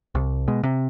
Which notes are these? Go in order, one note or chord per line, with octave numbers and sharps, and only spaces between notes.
C2
B2 G#3
C3